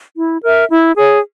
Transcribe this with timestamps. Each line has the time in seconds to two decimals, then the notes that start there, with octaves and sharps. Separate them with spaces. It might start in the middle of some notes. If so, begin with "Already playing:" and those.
0.16 E4
0.43 A#4 E5
0.70 E4
0.97 G#4 C#5